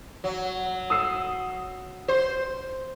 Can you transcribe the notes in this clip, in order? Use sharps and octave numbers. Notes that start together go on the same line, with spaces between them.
F#3
D#6 E6 C7
C5